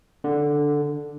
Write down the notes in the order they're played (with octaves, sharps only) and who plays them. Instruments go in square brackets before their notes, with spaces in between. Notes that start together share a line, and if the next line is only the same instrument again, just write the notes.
[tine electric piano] D3